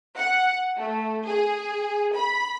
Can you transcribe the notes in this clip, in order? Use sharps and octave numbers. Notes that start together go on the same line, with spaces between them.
F#5
A3
G#4
B5